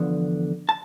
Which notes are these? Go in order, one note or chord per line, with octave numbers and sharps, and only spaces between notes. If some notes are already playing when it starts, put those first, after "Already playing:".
Already playing: E2 D3 F3 B3
A5